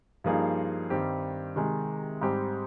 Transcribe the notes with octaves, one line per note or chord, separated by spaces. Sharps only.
G2 F3 A#3 D#4 G#4
G2 D#3 G3 C4 G4
C3 D#3 G#3
G#2 G3 C4 G4